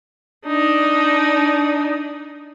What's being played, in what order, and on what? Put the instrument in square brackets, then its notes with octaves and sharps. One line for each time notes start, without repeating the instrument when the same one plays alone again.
[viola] D4 D#4